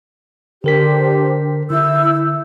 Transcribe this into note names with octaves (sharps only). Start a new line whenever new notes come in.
D3 D4 G4 A#4 C5 B6
D3 E4 E6 G6